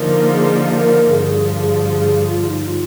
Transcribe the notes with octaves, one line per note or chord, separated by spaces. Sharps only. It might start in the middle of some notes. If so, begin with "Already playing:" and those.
Already playing: D3 F3 A#3 D#4 A#4
G#4
A#4
G2 D3 F3 G#4
G#4
G#4
F4
D#4
F4